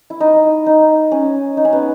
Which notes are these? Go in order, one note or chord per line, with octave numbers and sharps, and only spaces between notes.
E4
D#4
D#4
C#4
D#4
C#4
B3